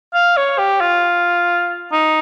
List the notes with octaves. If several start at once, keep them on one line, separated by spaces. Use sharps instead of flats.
F5
C#5
G4
F4
D#4